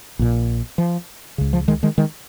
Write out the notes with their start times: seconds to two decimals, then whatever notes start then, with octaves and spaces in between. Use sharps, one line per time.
0.19 A#1 A#2
0.78 F3
1.38 C#2 C#3
1.53 F3
1.68 D#3 G#3
1.83 D#3 G#3
1.98 D#3 G#3